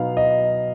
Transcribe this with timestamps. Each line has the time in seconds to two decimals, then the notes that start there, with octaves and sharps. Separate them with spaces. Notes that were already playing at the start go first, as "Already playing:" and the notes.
Already playing: B2 F#3 B3 D#4 F5
0.17 D#5